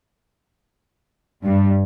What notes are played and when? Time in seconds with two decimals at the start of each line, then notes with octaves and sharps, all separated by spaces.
1.44 G2